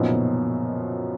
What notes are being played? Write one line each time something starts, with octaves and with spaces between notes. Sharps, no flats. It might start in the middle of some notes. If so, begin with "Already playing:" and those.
Already playing: F#2 A#2 F3 B3 D#4
C#3
B2
C#3